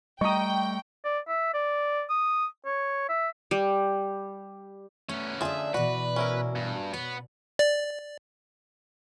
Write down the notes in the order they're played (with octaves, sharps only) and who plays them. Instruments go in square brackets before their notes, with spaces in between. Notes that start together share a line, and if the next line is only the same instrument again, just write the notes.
[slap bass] G3 A3 [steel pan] D#5 D#6 [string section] G5 [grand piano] A#5 C#6
[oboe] D5
E5
D5
D#6
C#5
E5
[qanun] G3
[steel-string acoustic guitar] A3 [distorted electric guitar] B3 C#4
[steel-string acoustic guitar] D3 C#4 D4 [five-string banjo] F3 G#4 [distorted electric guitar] E5
[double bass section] B2 [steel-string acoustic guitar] E3 D5 [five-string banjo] F#4 [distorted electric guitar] B4
[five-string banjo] C#4 E4 A#4
[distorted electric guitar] G2
[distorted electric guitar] B3 [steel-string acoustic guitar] C#5
[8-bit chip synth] D5